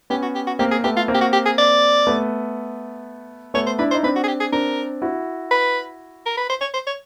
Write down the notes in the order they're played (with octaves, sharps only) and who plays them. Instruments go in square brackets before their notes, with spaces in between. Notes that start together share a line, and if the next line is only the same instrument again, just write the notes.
[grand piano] B3 C#4 [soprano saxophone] G4
[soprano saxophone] F#4
G4
F#4
[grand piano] A#3 C4 [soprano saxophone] G4
[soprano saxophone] G#4
[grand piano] C4
[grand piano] A3 B3 [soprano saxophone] G4
[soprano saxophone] F4
[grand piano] A#3 C4
[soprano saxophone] G4
F#4
G4
G#4
D5
[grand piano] A3 B3
[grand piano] A3 B3 [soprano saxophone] C#5
[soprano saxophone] C5
[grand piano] D4 E4 [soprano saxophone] B4
[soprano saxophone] C5
[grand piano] D#4
[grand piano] C4 D4 [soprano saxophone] B4
[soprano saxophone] F#4
G#4
G4
G#4
[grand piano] C4 D4 [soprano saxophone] A#4
[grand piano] E4 F#4
[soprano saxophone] B4
A#4
B4
C5
C#5
C5
C#5